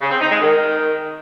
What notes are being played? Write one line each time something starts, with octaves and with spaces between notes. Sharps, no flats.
C#3
C4
D#4
G#3
D#3